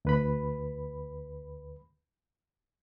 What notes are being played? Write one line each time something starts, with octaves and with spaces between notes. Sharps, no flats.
D2 B4 B5